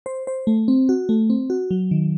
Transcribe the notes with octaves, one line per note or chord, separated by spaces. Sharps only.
C5
C5
A3
C4
F#4
A3
C4
F#4
F#3
D#3